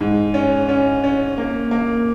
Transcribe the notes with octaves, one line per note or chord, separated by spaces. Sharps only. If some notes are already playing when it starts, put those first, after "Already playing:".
G#2
C#4
C#4
C#4
A#3
A#3